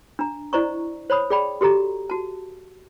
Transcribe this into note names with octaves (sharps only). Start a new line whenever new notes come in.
D4 A#5
E4 C5 D5 D#5 A#5 C#6
C5 C#5 B5 D#6
G#4 D5 G5 B5
F#4 G4 A4 A#5
F#4 A5